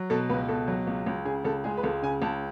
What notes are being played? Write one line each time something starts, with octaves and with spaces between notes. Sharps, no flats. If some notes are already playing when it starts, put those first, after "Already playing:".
Already playing: F#3
B2 A4
C#2 B4
B2 A4
F#3
C#2
C#2
C#3 G#4
C#2 A4
G#3 G#4
B4
C#2 A4
C#3 G#5
C#2 A5